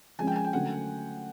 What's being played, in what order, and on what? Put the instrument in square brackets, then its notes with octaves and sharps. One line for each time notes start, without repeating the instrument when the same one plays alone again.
[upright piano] F3 G#3 C#4 [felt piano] G#5
[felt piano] G5
G#5
G5
[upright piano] D3 F#3 A3 C#4 [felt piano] F#5